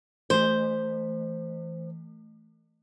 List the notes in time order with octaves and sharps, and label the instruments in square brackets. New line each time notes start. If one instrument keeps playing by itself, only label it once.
[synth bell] E3 A3 [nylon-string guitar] C5